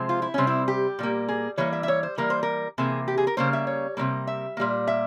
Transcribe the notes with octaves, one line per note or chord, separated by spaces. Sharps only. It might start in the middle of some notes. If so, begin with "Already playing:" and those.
Already playing: C3 F3 G#3 C4
F4
E4
C3 G3 C4 C#4
E4
G4
A#2 G3 A#3
G#4
E3 G3 A#3 C#5
E5
E5
C#5
C5
E3 G3 A#3 A#4
C5
A#4
C3 E3 A#3 G#4
G4
G#4
A#4
C#3 G3 A#3 C5
E5
C#5
C3 E3 G3 A#3
E5
A#2 G3 A#3
E5